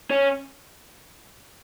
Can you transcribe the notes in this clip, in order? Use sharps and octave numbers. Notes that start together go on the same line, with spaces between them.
C#4